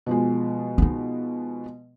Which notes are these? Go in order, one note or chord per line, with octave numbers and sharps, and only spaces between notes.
B2 F3 G#3
B3 D#4